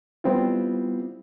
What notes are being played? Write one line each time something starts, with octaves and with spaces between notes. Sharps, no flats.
G3 B3 C4 E4 F4